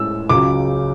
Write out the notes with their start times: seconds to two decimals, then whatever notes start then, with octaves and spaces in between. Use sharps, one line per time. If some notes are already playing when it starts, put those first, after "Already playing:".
Already playing: A2 G#3 C#4 E6
0.29 C#2 C#3 F#3 D6